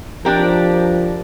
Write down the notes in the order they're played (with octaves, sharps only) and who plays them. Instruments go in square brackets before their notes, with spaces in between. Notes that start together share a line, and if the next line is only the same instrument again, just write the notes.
[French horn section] F3 [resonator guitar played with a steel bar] D4 G4 A#4